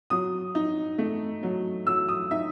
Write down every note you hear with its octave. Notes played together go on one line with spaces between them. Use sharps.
F#3 D#6
D#4
A3
F#3
F#3 E6
D#6
D#4 E5